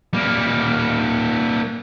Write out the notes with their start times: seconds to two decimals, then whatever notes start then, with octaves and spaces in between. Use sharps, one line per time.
0.13 G3 A#3